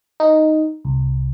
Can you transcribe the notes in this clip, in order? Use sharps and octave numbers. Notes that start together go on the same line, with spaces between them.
D#4
C2